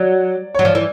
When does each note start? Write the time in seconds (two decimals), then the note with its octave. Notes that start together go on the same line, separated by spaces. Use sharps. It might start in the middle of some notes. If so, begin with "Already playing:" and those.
Already playing: F#3 D5
0.55 F#3 C#5
0.65 F3 D5
0.75 E3